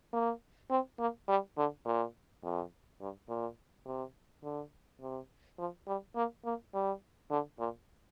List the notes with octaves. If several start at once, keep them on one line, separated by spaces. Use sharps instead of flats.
A#3
C4
A#3
G3
D3
A#2
F2
G2
A#2
C3
D3
C3
F3
G3
A#3
A#3
G3
D3
A#2